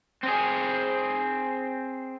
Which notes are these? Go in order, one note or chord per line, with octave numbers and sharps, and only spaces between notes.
C4 G#4